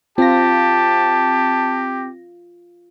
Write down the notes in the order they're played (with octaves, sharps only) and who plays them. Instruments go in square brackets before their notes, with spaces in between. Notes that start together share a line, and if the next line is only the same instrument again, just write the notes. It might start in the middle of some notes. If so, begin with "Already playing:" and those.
[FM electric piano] C4 A#6 [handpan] F4 [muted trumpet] G4 [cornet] A5